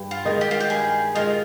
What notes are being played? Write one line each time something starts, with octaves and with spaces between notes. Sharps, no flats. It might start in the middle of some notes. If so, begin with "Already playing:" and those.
Already playing: G2
F4
D#3 G#3 D#4
G4
F4
G4
G2 G#4
D#3 G#3 D#4 F4